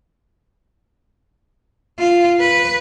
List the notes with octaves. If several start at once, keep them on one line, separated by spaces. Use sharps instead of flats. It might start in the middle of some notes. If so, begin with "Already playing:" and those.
F4
B4